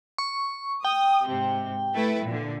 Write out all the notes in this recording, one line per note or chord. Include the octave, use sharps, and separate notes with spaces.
C#6
G5 D#6
G#2 C3
A3 E4 B4
A#2 D3